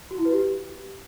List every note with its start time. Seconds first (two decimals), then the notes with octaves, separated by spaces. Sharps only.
0.11 F#4
0.18 E4
0.25 B4
0.32 G4